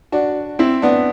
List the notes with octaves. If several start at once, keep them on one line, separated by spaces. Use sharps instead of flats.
D4 F#4
C4 E4
B3 D4